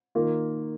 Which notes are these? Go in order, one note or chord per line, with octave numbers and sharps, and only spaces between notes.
D#3 A#3 F4